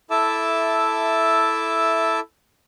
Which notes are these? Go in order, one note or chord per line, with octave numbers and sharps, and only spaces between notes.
E4 A4 E5 A5 D6 E6